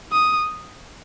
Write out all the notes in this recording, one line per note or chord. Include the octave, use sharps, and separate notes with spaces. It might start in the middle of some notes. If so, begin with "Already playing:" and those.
D#6